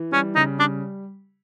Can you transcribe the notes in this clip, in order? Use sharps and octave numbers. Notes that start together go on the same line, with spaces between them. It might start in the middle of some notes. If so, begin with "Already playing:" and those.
Already playing: E3
G3 C#4
C#3 D#4
G3 D4